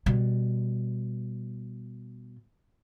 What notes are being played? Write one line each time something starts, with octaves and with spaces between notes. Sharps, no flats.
B2 G3